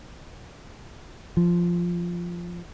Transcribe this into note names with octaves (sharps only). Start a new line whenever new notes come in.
F3